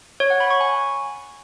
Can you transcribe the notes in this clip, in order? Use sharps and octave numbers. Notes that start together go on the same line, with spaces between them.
C#5
F#5
B5
C#6
G#5